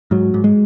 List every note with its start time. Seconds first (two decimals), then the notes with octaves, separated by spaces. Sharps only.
0.11 G#2 F#3
0.34 G#2
0.44 G#3